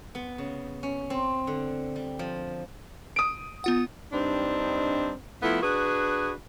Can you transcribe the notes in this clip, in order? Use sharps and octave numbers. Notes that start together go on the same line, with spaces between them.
B3
C#3
C#4
C4
D3
G3
F3
D#6 D7
B3 F4 F#5
G2 C4 D4 D#4
F3 A3 B3 E4
D4 F#4 G#4 B4